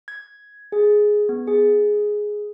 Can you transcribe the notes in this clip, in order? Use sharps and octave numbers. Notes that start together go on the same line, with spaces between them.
G#6
G#4
B3
G#4